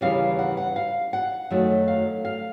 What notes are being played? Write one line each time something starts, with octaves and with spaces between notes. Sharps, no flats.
D#2 C#3 E3 G3 F5
F#5
F#5
F5
F#5
F#2 D#3 F#3 A3
F5
F5